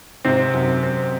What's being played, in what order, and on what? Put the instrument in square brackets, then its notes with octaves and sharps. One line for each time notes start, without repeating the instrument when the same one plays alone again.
[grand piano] G#2 C3 [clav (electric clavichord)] C4
[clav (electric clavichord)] F#2
C4